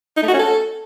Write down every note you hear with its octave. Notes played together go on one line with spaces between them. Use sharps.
D#4
A3
F#4
C#4
A4